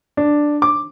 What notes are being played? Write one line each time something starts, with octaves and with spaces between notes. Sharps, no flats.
D4
D6